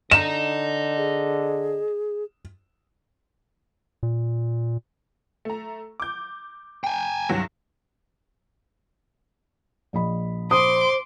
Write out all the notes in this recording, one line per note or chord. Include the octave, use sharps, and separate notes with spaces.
D3 D#5 A#5 E7
G#4
A#2
A3 A#5
D6 G6
G5 G#5
C2 G2 F#3
A#1 D#5 B5
C5 C6 D6 D#6